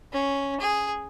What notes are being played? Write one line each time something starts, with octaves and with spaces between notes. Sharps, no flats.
C#4
G#4